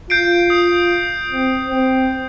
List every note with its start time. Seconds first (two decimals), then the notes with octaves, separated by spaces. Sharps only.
0.10 F4 G6 C7 D7
0.50 D#6
1.32 C4
1.69 C4